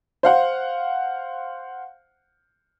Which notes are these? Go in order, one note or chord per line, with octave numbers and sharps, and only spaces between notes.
C5 F5 F#5